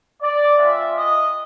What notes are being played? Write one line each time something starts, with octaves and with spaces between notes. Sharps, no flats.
D5
G#3 C4 F4 E5
D#5